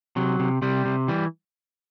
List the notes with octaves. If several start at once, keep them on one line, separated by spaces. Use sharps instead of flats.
C3 F#3
C3
C3 G3
C3
E3 G3